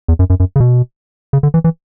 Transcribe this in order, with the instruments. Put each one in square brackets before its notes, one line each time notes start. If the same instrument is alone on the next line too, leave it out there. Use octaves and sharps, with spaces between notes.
[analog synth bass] E2
F#2
F#2
F#2
C#3
B2
C#3
D3
E3
E3